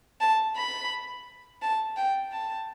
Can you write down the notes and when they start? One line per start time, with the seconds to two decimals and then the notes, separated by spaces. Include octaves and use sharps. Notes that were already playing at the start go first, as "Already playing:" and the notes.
0.21 A5
0.56 B5
1.62 A5
1.97 G5
2.33 A5